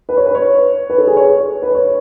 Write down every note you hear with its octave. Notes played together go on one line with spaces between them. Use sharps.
B4
C#5
B4
C#5
B4
A4
G#4
C#5
B4
C#5